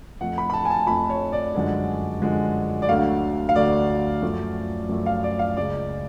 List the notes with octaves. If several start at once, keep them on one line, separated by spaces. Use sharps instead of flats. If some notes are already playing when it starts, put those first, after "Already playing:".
F2 F3 A3 F#5
B5
B5
A5
G#5
A5
F2 F3 A3 B5
C#5
D5
F#2 D3 F3 G#3
F#2 D3 F3 G#3
D5
D2 D3 F#3 A3 F5
F5
D2 D3 F#3 A3 D5
F#2 F3 A3
F#2 F3 A3
F5
D5
F5
C#2 C#3 G#3 D5